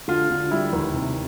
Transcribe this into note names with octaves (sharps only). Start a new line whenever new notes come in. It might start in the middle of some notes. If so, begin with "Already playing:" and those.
D3 F4
D3
G3 E4
D#2
C3